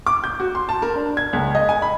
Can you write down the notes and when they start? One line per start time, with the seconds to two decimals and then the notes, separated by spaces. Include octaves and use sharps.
0.06 D6
0.24 G6
0.40 F#4
0.55 C6
0.69 A5
0.82 A#4
0.96 D4
1.17 G#6
1.33 C#2
1.55 D#5
1.69 G#5
1.82 B5